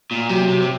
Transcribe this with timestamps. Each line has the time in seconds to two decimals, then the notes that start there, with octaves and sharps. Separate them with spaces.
0.11 A#2
0.29 C3 F#3
0.48 C3
0.61 C3